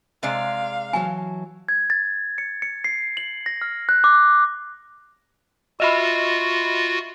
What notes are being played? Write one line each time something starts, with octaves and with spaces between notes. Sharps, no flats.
C3 G#3 D5 F5
E3 F#3 G#5 A5
G#6
A6
C#7
C#7
C7
F#7
A#6
F6
F#6
D6
F4 F#4 D#5 E5 B5